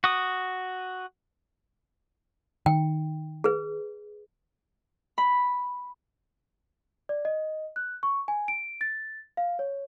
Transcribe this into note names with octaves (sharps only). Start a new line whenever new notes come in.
F#4 D#6
D#3 G5
G#4 B4
B5
D5
D#5
F#6
C#6
G#5
D7
A6
F5
C#5